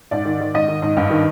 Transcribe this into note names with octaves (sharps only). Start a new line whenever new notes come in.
G#2 D5
D#3
D#3
G#2 D#5
D#3
G#2
G2
D#3